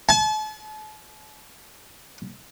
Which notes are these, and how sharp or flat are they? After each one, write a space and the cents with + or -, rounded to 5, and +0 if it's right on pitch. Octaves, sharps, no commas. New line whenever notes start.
A5 -40